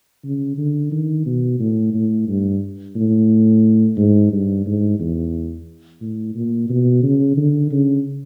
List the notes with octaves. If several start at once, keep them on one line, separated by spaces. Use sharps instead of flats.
C#3
D3
D#3
B2
A2
A2
G2
A2
G#2
G2
G#2
E2
A2
A#2
B2
C#3
D3
C#3